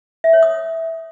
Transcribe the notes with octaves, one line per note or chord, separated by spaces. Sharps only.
E5
C#5
D#6